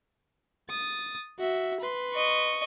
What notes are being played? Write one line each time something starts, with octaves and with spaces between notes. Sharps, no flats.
D#6 A6
F#4 E5
B4 C6
D#5 C#6